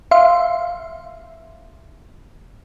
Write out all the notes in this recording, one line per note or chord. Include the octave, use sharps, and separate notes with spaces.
E5 F5 C6